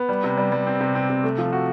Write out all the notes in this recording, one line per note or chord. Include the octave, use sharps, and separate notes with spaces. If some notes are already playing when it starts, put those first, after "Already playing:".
Already playing: B3
G3
C3
G3
G3
C4
C3
C4
C3
A3
F3
F#4